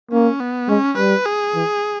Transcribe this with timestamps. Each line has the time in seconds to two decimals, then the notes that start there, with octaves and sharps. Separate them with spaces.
0.11 A#3 C#4
0.40 B3
0.69 G#3 C#4
0.97 G3 B4
1.26 G#4
1.55 E3